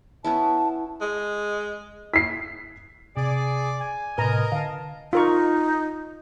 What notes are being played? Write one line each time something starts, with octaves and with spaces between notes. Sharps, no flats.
B3 C#4 E4 A5
G#3
B6 C7
C3 G#4 D5
G#5
A2 C3 A#4 B4 D#5 A#5
D3 F5 A5
D#4 F4 A#4 C#6